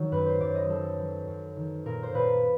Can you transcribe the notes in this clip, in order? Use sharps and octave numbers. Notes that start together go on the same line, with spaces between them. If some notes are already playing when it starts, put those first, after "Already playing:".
Already playing: D#3 F#3
F#2 B4
C5
F#2 D5
D#5
F#3 A4
F#3
F#2
D#3
A#2 A#4
C5
A#2 B4